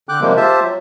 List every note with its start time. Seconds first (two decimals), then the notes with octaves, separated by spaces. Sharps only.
0.09 D3 G5 D6 F#6
0.21 C3 D#3 F3 G3 G#3 A#3
0.37 F4 G4 C5 E5 A5
0.63 F#3